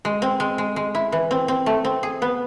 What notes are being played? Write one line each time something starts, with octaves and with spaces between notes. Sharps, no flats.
G#3
C4
G#3
G#3
G#3
E4
E3
C4
C4
A3
C4
G#4
B3